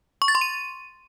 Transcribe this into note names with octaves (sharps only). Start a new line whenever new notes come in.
C#6
A6
C6
D#7